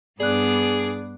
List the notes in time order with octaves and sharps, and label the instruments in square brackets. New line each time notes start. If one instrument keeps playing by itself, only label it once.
[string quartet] G2 D4 D6 [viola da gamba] B3 [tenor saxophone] G#4 [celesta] D5 F#6